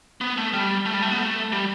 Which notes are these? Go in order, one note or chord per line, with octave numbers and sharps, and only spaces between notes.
B3
A3
G3
A3
G3
A3
B3
A3
G3